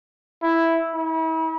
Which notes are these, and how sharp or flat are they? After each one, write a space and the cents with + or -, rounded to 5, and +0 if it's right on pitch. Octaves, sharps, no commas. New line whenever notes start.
E4 +0
E4 -40